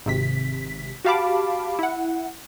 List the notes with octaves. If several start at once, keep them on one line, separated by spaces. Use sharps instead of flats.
G#1 C3 B6
F#4 G4 F5 A5 B5 D6
E4 F#5